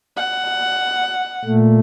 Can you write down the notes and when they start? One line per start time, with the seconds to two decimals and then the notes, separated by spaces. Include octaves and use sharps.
0.16 F#5
1.45 A#2 A3